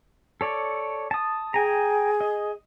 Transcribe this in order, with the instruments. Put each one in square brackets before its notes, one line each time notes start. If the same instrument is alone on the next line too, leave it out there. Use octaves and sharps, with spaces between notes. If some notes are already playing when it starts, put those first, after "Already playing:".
[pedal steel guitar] A4 C#5 D5
A5 D#6
[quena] G#4 [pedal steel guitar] G5 G#5 A#5
[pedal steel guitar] D#5